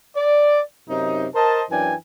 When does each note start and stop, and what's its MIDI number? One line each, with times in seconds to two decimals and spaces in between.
0.16 0.60 74
0.89 1.26 42
0.89 1.26 48
0.89 1.26 63
1.35 1.63 70
1.35 1.63 72
1.35 1.63 75
1.35 1.63 81
1.70 1.94 42
1.70 1.94 52
1.70 1.94 62
1.70 1.94 79
1.70 1.94 80